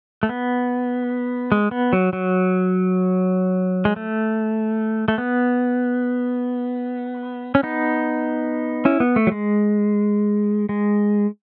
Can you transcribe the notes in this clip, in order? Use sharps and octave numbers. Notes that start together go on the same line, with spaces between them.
A3
B3
G#3
B3
F#3
F#3
G#3
A3
A3
B3
C#4
B3 D#4
C#4 E4
B3
A3
F#3
G#3
G#3